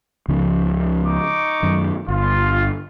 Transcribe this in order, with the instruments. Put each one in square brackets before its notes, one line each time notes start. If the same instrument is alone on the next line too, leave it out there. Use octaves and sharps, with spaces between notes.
[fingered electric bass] C#2 C#3 F3
[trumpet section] D#4 C#6 D6
[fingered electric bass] F#2 D#3
[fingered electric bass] G1 [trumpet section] F4